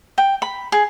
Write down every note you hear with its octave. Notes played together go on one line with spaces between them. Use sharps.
G5
B5
G#4